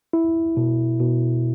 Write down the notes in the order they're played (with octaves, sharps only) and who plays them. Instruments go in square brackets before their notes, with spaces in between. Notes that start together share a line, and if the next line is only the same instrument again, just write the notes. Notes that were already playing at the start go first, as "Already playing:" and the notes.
[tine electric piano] E4
B2
B2